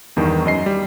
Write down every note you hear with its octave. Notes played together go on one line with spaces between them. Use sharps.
E2 G2 D#3
F#2 D#5 C7
G3